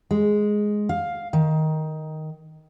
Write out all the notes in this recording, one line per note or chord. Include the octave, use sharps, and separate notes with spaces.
G#3
F5
D#3